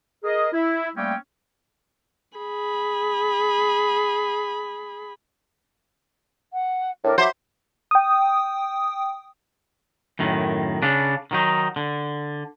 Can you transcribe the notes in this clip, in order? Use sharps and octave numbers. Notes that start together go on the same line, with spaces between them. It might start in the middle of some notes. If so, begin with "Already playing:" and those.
G#4 A#4 D#5
E4
G3 A3 A#3 C4 C#4 G5
G#4 B5
F#5
A2 D4 A#4
F#3 C5 E5 B5 D6
G5 D#6
F#2 A2 D#3
C#3 D4
D#3 F#3 D#4
D3